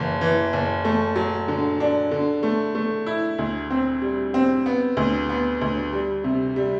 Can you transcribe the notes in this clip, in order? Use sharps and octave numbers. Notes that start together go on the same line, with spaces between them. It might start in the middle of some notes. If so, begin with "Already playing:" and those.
Already playing: F#1 E3
E3
F#1
A3
F#3
D3
D4
D3
A3
A3
E4
D2
C4
G3
C4
B3
D2
B3
D2
G3
C3
G3